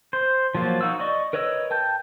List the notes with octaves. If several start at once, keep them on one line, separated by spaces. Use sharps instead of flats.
C5
F3 F#3 A#3 F4
D#4 F#4 E6
D5 D#5 C#6
A#4 B4 C#5 D#5 E6
G5 A5 G6